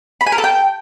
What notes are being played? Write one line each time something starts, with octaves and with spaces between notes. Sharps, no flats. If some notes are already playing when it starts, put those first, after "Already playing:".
B5
G#5
A#4
A4
G5